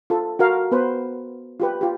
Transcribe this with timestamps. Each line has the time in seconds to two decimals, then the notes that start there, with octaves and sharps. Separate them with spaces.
0.10 F4 A4
0.39 F#4 A#4 F5
0.71 B3 B4 C5
1.60 F4 G4 B4
1.81 F4 G4